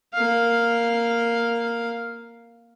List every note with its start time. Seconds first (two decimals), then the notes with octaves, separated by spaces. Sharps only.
0.14 A#3 F5